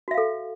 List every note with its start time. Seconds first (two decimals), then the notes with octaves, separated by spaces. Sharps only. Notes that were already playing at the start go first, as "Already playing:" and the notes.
0.08 F#4
0.11 E5
0.14 F5
0.18 A4